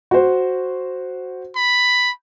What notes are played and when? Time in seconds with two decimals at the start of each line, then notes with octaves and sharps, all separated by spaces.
0.11 F#4 C5
1.56 B5